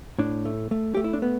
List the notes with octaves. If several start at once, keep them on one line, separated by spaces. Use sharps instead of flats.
A2 D4
A3
A3
A3 G4
E4
D4
B3